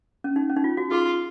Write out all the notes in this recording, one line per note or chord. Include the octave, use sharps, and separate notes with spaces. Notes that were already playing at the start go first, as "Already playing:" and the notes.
C#4
D#4
C#4
D#4
F4
F#4
F4 G#4